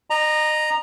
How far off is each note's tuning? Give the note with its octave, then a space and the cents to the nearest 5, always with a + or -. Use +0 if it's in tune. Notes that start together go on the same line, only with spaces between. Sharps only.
D#5 -35 A#5 +0